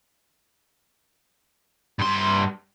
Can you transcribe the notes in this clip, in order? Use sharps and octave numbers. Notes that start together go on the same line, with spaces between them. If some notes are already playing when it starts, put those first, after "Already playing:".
G2 C6